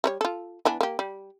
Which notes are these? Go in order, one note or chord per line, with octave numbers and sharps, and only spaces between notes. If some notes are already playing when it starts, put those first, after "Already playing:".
G3 A#4 C#5
F4 A4
E3 B3 D4
A#3 G4
G3